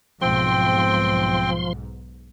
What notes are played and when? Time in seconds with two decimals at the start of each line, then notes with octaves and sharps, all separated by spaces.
0.22 B1 G#2 F3 C4 G5 C6